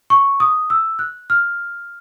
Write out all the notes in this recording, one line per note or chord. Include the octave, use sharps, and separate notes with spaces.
C#6
D#6
E6
F#6
F6